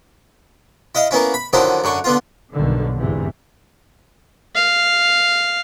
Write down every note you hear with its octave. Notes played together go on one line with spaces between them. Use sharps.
E4 D#5 F5
A#3 B3 C#4 E4
B5
D3 D#3 F3 F#3 E4
F#2 D3 C#6
D3 B3 F4
B1 G2 B2 D3 D#3
G1 E2 G#2 C3 E3
F5